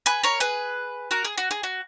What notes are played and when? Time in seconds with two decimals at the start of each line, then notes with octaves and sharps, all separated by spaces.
0.06 G#4 B4
0.23 A#4 C#5
0.40 G#4 B4
1.11 F#4 A#4
1.25 G#4
1.38 F#4
1.51 G#4
1.63 F#4